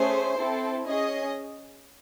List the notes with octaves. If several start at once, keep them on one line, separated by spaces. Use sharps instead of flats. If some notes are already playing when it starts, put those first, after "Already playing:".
Already playing: A3 C#4 G#4 C5
C4 E4 A4
C#4 G#4 D#5